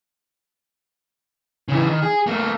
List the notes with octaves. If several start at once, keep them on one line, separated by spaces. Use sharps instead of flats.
C#3 E3
D#3
G#4
A3 A#3